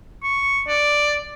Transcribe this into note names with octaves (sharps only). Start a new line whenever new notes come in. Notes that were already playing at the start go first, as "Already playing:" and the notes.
C#6
D5